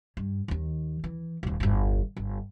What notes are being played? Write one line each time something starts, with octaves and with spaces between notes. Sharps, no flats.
G2
D#2 D#3
E3
D#1 D#2
G1 E2
G1